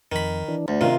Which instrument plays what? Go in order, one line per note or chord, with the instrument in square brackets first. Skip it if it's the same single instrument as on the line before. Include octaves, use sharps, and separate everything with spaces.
[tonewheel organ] F2 [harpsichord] D#3 B5
[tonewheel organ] E3 D4
[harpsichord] D2 [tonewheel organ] D4
[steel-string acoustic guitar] C3 F4 F5 [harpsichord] D#3